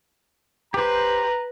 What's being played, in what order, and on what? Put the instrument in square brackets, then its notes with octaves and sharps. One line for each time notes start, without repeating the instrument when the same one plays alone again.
[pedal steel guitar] G4 C5 [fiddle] B4 [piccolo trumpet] A#5